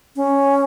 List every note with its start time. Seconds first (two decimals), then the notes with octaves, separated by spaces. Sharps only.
0.16 C#4